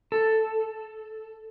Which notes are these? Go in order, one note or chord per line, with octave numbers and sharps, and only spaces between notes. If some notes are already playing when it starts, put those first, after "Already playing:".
A4